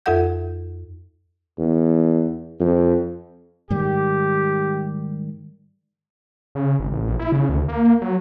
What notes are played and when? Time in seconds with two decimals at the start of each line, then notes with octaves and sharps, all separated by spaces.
0.06 F2 F4 A4 E5 F#5 G6
1.58 E2
2.60 F2
3.70 G#2 D#3 G3 G4
6.55 C#3
6.80 G#1
6.92 A1
7.08 A#1
7.20 E4
7.32 C#3
7.49 D2
7.68 A#3
8.02 F#3